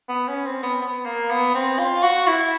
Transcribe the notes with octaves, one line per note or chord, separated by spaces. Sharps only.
B3
C#4
C4
B3
B3
A#3
B3
C4
F4
F#4
E4